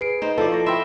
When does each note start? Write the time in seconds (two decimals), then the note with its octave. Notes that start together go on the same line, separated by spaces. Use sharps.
0.01 G#4 B4 C7 D7
0.22 D#4 C5
0.38 F3 E4 F4 A4 D5
0.52 C#6 A#6
0.66 C4 E5 B5 C6 E6